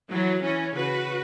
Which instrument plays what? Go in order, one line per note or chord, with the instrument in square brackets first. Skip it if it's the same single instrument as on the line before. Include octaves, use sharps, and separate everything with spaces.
[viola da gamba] E3 [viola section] F#3
[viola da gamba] E3 [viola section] C#4
[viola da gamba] C#3 [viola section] F#4 B4